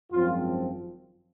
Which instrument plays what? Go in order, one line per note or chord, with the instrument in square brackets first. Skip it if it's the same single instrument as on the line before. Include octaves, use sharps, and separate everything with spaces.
[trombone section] G#1 F#2 F3 C4 F4